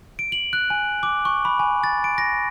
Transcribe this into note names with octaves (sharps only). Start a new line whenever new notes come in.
D7
F#7
F#6
G#5
D6
C#6
B5
G#5
A6
D7
A#6